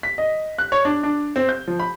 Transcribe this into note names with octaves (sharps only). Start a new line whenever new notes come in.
B6
D#5
F#6
C#5
D4
D4
C4
G6
F3
B5